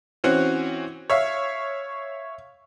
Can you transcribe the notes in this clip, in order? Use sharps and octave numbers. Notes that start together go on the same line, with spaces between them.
E3 C4 C#4 F#4
C#5 E5 F5